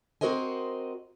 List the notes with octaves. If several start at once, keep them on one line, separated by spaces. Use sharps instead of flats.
C4 F#4 A#4 C5 D#5 G#5